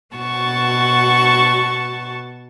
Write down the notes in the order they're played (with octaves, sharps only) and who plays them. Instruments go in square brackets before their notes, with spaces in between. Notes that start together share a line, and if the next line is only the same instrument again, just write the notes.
[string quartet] B2 F#4 A5 C#6